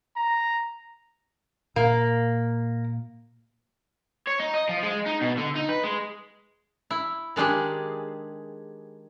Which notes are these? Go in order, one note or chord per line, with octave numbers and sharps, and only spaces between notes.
A#5
A#2 A#3
C#5
D#4
D#5
F3
G#3
D#4
B2
D3
D#4
B4
G#3
E4
D#3 G#3 D4 G4 G#4